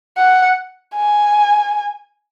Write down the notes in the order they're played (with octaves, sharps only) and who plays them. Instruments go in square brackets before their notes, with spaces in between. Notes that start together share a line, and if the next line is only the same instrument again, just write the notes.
[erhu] F#5
G#5